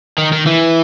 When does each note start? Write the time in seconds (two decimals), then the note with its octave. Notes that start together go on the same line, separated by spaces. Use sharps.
0.18 D#3
0.33 D#3
0.46 E3